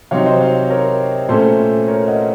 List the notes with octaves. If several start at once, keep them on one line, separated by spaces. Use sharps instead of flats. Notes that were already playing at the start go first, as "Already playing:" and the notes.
C3 F#3 C4 D#4 C#5 F5
C5 D#5
C#5 F5
A#4 C#5
A#2 A3 C#4 A4 C5
A#4 C#5
D#5 F#5